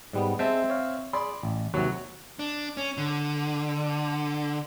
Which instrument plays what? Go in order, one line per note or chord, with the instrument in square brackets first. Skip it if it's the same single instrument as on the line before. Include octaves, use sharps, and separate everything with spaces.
[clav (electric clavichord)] G#2 G3 B3
[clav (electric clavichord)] G#3 A5 [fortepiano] C4 E5
[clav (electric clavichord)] C#5 F5
[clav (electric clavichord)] G#4 [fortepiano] D5 B5 C6
[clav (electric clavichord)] A1
[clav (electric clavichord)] D#2 C3 [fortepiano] F#3 F#4
[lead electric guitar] D4
C#4
D3